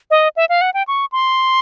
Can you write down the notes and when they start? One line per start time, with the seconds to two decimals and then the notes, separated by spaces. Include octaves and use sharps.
0.11 D#5
0.36 E5
0.49 F5
0.61 F#5
0.74 G5
0.88 C#6
1.12 C6